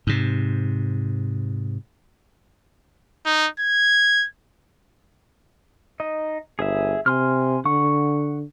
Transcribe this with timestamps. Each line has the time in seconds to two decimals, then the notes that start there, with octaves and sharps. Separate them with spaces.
0.07 G#2 C3
3.26 D#4
3.60 G#6
6.00 D#4 D#5
6.59 G1 G#4 E5
7.06 C3 G#5 C6 F6
7.65 D3 F#5 C#6